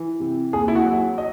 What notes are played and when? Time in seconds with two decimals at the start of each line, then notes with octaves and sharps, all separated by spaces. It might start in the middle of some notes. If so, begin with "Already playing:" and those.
Already playing: E3
0.20 C3
0.53 D#2 G#4
0.68 E4
0.75 F#4
0.86 F#3
1.18 D#5